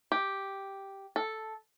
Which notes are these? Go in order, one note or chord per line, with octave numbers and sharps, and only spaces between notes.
G4
A4